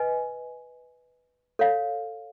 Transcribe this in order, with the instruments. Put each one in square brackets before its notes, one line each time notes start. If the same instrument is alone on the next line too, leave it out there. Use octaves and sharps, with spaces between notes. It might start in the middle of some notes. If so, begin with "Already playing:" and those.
Already playing: [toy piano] B4 D#5 G#5
A4 C#5 F5